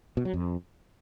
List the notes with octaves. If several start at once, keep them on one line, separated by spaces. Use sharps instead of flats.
B2
F#3
F2